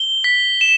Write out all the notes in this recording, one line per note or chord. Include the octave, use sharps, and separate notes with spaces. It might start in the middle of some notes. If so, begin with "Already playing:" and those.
Already playing: G7
B6
E7